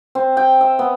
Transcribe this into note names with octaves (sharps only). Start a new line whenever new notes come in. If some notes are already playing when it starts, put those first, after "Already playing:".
C4
G5
E5
B3